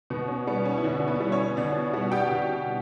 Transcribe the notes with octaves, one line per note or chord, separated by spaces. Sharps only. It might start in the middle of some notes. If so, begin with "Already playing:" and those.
B2 B3
C#4
G3 B3
C#4
E4
B2 D3 D4
B3 B4
G3
C#4 C#5
B2 D4 D5
G3 F#4 F#5
G4 G5
B2